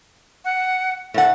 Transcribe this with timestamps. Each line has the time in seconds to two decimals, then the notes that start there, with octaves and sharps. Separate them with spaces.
0.45 F#5
1.14 A2 A4 F#5